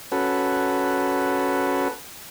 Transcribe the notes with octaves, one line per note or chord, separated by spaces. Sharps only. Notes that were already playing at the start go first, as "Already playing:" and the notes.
C#4 F#4 A4 B4